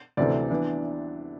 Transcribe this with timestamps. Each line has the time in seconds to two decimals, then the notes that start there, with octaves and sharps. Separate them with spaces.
0.17 D2 C3 E3 A3 D5
0.50 E3 B3 D4